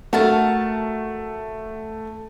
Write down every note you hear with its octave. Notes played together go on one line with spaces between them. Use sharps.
A3 F#4 A#4 A5